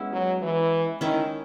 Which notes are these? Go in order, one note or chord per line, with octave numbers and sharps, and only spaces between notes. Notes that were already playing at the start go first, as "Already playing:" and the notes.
Already playing: G#3 B3 C#4 E4
F#3
E3
D#3 C#4 E4